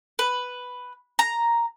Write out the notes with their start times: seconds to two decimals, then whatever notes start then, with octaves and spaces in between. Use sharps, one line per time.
0.19 B4
1.19 A#5